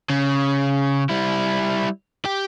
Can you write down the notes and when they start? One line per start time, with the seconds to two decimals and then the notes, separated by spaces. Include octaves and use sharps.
0.10 C#3
1.09 G3 E4
2.25 G4